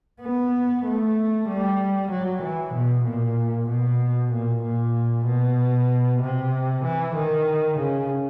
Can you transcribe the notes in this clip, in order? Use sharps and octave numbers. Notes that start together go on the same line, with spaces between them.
B3
A3
G3
F#3
E3
B2
A#2
B2
A#2
A#2
B2
C3
E3
D#3
C#3